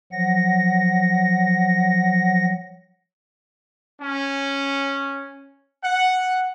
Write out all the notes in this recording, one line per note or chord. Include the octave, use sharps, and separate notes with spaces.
F3 F#3 F#5 A#6
C#4
F#5